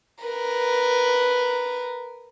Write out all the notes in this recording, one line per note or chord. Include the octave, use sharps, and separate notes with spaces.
A#4 B4